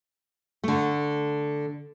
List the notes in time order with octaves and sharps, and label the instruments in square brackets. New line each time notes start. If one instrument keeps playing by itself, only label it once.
[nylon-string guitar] D3 A3